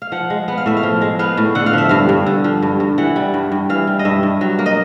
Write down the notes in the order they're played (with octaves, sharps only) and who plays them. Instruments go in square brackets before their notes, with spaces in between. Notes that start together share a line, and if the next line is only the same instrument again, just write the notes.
[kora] F5
F3 F#5
G#3
B3 F#5
F5
A2 E5
F5
F3
G#3
B3 F5
A2
D3 F#5
F5
F3 E5
G2 F5
G2
D3
F3
G2
G2
E3 F#5
G3
G2
G2
E3 F5
G3
D#5
G2 E5
G2
F#3
A#3
D#5